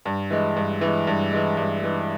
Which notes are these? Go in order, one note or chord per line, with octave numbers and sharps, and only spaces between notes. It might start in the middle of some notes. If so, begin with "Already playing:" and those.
G2
E3 G#3
G2
E3 G#3
G2
E3 G#3
G2
E3 G#3